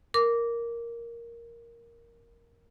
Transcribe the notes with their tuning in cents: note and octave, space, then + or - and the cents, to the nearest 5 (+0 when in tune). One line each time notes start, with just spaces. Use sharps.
A#4 +0 D6 -15